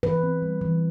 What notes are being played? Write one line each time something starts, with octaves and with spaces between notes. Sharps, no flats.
E3 B4
C4
G3
E3